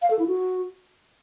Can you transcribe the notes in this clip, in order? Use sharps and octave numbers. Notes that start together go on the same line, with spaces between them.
F5
A4
E4
F#4